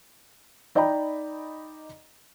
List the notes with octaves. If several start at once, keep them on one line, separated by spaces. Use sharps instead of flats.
D#4 D5 D#5 G5 A#5 B5